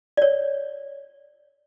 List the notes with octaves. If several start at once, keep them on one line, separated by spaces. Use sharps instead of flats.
C#5 D5